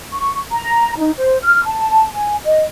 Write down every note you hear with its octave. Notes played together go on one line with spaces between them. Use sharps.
C#6
A#5
D#4
C5
F6
A5
G#5
D#5